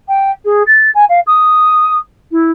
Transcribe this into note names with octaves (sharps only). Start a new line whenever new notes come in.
G5
G#4
A6
G#5
F5
D#6
E4